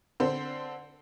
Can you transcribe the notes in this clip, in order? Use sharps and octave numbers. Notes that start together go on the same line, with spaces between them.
D3 C4 C5